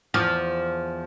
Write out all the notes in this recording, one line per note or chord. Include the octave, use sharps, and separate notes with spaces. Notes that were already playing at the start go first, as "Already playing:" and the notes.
E2 F3